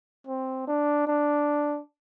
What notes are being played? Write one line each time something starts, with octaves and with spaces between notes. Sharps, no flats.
C4
D4
D4